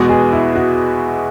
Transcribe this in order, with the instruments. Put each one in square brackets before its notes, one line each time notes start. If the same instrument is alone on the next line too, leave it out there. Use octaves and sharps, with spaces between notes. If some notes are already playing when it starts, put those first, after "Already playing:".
Already playing: [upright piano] E2 B2 G#3 [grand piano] F#4
[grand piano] G#4
E4
F#4